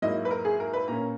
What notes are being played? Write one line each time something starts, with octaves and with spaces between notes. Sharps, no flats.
G#2 F#3 A#3 E4 D#5
B4
A#4
G#4
A#4
B4
A#2 A#3 C#4 A#5